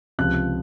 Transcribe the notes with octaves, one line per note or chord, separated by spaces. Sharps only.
C#2 C3 F3 F#6